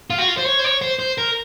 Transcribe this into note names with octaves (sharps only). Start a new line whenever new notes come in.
F4
F#4
F4
C5
C#5
C5
C#5
C5
C5
A#4